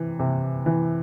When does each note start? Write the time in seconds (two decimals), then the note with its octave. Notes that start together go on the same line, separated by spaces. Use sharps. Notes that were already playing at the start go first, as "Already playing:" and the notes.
Already playing: C3 E3
0.19 C3
0.66 E3